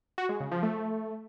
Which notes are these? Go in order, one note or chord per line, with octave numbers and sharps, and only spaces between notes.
F#4
G#3
C#3
F3
A3